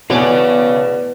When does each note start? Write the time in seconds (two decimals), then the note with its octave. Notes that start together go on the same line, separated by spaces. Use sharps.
0.10 B2 E3 A3 G#4 B4 C#5 D5